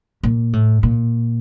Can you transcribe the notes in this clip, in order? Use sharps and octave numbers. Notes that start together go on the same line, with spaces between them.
A#2
A2
A#2